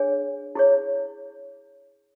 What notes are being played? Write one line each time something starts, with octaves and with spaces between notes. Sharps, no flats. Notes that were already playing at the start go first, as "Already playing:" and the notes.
Already playing: D4 G#4 C#5 G#5
E4 G#4 C#5